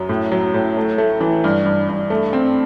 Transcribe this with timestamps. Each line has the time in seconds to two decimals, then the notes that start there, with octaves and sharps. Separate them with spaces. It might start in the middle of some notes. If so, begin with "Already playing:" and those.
Already playing: F#2 F#3
0.09 A2
0.32 F#3
0.54 A2
0.77 A3
0.98 A3
1.21 E3
1.44 G2
1.66 G2
1.88 G2
2.10 A3
2.33 C4